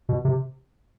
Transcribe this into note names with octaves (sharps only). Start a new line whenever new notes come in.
B2
C3